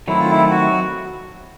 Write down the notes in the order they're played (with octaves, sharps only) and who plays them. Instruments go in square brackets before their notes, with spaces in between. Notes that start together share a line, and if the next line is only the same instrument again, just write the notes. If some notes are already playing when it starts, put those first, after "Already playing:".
[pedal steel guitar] D#3 F#3 A3 C4 [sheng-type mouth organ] E4
[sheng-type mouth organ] F4
E4
F#4